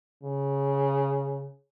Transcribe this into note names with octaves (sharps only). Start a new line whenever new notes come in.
C#3